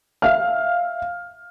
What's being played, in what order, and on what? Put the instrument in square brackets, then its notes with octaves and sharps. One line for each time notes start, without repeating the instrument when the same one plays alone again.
[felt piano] E5 F5 F6